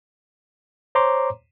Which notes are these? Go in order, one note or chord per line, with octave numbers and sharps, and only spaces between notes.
C5 C#5 A#5 C6 D6